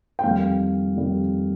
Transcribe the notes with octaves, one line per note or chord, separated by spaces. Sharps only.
G5
F2 D#3 G3 F5
F2 D#3 G3